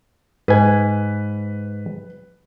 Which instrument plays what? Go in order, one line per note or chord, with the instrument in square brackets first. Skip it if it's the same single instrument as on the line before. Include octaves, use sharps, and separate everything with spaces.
[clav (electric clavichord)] G#2 G#5 [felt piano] B4